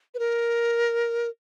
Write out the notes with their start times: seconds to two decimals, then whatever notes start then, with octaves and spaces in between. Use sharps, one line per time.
0.14 B4
0.19 A#4